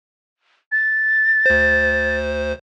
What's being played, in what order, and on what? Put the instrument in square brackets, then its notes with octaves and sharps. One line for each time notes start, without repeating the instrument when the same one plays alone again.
[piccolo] A6
[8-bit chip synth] D2 C5